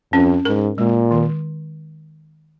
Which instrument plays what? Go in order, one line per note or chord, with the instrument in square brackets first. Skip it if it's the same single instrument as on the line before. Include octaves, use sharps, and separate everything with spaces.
[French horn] F2 [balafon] C#4
[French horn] G#2 [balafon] A#4
[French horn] A#2 [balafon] G#3
[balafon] D#3